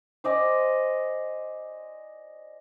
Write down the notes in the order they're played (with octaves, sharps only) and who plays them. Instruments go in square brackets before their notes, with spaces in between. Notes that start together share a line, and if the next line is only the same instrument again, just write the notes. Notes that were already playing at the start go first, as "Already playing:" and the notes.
[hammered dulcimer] C5 D5 D#5 G#5